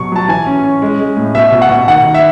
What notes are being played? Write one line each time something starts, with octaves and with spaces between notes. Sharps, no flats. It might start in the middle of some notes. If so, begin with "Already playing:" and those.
Already playing: B2 F#3 C#6
F#3 A5
E3 G#5
C#4
C#4
G#3
G#3
A2
B2 E5
B2
F#5
B2
D#3 F#5
D#3
E5